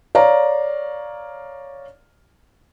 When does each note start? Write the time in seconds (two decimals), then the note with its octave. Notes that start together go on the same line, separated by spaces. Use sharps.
0.15 C#5 D5 F5 A#5